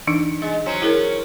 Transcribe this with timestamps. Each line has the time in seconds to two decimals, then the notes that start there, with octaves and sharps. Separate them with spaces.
0.07 E3 D4 D#4
0.42 G#3
0.66 F#3 C#4 C5
0.82 E4 G#4 A#4